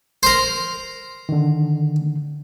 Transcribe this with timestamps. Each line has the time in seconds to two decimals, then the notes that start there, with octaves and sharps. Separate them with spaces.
0.23 A#4 C5
1.29 D3 D#3